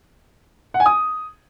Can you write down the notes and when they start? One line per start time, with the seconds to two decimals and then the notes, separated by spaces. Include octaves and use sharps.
0.74 F#5
0.80 G#5
0.86 D#6